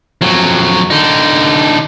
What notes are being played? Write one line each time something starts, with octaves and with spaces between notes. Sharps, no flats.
F2 F#3
D3 D#4